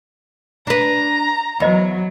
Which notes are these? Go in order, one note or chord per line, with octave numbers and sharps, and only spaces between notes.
D4 B4 A#5
E2 F#3 C5 D#5 B5